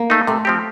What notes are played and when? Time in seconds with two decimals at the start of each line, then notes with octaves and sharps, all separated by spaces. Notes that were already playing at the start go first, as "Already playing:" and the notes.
Already playing: A#3
0.10 A3 D#4
0.27 C3 A3
0.45 F3 C4 G4